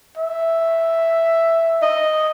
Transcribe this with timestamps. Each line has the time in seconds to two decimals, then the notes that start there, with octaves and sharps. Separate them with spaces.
0.18 E5
1.82 D#5